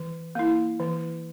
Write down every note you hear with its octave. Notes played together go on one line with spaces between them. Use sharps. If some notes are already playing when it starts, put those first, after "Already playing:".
Already playing: E3
A#3 E4
E3